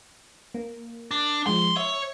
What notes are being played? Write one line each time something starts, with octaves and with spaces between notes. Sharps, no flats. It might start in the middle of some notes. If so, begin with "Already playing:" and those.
A#3
D4
F3 G#3 C6
C#5 E5